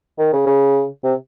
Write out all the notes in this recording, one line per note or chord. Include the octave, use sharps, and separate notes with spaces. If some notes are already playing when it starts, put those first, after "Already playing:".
D#3
C#3
C#3
C3